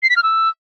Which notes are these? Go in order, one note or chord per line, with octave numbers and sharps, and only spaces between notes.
C7
B6
F6
E6